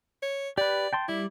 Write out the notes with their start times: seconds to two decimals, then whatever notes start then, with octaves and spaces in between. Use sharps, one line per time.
0.23 C#5
0.58 G4 B4 D5
0.93 G5 A5 C6
1.08 G3 E4 D5